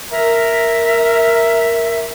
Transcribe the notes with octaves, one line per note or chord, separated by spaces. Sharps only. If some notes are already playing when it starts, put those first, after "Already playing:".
A#4 E5